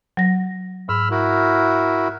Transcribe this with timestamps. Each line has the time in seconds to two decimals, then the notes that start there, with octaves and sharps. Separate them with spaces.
0.17 F#3 A#6
0.89 G#2 B5 E6 F6
1.11 E4 F#4 A#4